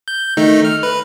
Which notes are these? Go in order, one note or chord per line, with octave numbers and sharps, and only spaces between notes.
G6
D#3 A3 D#4
F6
B4